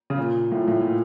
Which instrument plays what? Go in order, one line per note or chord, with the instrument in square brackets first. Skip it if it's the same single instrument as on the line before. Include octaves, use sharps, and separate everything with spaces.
[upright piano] C#3
A#2
A2
A#2
A2
A#2